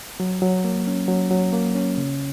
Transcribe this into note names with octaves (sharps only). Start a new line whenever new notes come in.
F#3
F#3
A#3
C#4
F#3
F#3
A#3
C#4
C#3